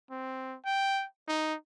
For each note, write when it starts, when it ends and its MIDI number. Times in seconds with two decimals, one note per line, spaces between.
0.11 0.57 60
0.65 1.05 79
1.28 1.55 63